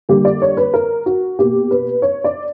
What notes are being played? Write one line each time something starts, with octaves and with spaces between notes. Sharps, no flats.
D3 G3 A#3 G4
D5
C#5
B4
A#4
F#4
B2 A#3 G4
B4
C#5
D5